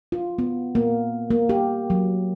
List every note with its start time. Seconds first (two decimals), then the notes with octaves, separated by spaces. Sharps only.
0.12 F4
0.39 B3
0.75 A#3
1.30 A#3
1.49 G4
1.90 F#3